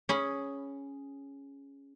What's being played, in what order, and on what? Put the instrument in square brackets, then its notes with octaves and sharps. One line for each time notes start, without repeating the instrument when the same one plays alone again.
[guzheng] C#4 G#4 B5